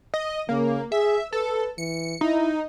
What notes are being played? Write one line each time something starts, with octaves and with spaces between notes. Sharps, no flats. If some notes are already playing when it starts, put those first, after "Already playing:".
D#5
C#3 A#3
G#4 E5
A4 B4
E3 C#7
D#4 E4